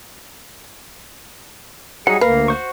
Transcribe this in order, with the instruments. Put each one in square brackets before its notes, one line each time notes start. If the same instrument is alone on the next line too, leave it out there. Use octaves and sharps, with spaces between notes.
[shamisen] F#3 [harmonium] G3 G#4 [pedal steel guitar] D#4 F#5
[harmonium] D2 A#3 [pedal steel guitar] A#4 F5 [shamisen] B4
[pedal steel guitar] F#4 C5 C#6